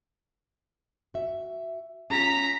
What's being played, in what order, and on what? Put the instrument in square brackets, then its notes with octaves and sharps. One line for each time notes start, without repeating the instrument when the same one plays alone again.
[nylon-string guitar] F#4 E5
[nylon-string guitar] C#4 F4 G#4 [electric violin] A#5 B6